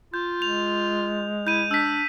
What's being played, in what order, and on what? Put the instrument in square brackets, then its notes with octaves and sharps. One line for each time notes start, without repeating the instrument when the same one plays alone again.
[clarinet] F4 [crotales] G6
[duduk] G#3 [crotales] F7
[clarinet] E4 [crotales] G6 D#7
[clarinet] D4 [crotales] E6 B6